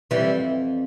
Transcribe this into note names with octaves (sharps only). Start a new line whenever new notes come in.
F2 E3 G3